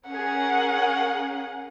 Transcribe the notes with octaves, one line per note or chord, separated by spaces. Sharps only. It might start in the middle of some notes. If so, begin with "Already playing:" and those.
C#4 G#4 A#4 F#5